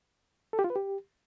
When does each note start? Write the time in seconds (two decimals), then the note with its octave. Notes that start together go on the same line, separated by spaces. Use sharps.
0.53 A4
0.59 G4
0.64 F4
0.70 B4
0.76 G4